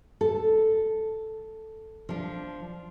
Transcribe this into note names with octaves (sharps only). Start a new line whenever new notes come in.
A4
F3 D4